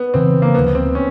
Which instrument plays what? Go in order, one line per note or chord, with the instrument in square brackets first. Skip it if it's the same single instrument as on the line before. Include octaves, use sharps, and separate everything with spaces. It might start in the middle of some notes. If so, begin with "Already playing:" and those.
Already playing: [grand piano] B3
[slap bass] F2 C#3 E3 [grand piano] C4
[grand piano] A#3
[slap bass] D2 C3 F3 [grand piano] B3
[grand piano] C4
C#4